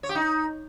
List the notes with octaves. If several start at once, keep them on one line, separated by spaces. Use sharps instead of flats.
C#5
G4
D#4